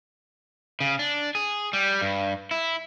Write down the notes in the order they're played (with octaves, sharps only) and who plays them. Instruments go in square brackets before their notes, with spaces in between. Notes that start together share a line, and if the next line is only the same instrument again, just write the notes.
[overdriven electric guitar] C#3
D4
G#4
G3
G2
E4